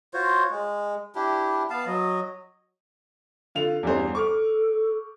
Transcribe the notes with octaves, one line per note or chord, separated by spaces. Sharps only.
F4 F#4 C5 C#5
G#3
D4 E4 G4
B3 F5 A5
F#3 D#5
D3 F4 F7
E2 G2 G4 C5
A4 C#6 D6 F6